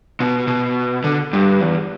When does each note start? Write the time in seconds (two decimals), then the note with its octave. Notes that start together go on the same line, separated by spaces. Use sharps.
0.20 B2
0.47 B2
1.04 D3
1.33 G2
1.61 E2